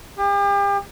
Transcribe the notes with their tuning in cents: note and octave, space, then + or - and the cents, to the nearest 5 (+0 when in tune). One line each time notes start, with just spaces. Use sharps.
G4 +40